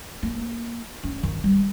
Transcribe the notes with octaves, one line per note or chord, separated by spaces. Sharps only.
A#3
C#4
D#3
G3